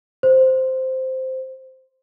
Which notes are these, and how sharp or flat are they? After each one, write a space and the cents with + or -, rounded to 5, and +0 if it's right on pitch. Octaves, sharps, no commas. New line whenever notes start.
C5 -5